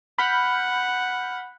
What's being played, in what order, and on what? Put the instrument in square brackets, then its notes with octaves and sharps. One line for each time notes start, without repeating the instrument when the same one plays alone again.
[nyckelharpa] F#5 [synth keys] B5 F6 G6